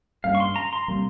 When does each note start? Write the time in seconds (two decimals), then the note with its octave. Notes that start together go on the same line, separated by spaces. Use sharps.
0.24 G2 G3 A#3 C#4 F5
0.35 C#6
0.40 C6
0.56 A#5
0.73 C6
0.88 C3 G3 A#3